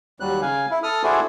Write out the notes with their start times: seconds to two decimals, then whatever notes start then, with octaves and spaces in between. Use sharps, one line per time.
0.20 D#2 F#3 G3 F#6
0.42 C#3 F5 G#5
0.71 E4
0.83 A4 D#6 F6
1.03 D4 E4 F#4 G#4 A4 C5